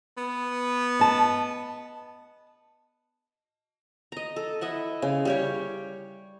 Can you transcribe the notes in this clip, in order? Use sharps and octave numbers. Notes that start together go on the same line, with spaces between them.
B3
D#5 A5
D#5 A#5
A4
E4 D#5 E5 F#5
C#3
G3 G4 C#5